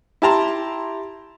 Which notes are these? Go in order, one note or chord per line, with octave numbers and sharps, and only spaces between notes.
E4 G4 A5 A#5 C6